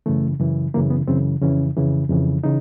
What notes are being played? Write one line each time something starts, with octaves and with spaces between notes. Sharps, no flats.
F#2 C#3 E3 A3
F#2 C#3 E3
F#2 C#3 E3 A#3
B3
F#2 C#3 E3 C4
F2 C#3 E3 C#4
F2 C#3 E3
F2 C#3 E3
C#3 E3 D#4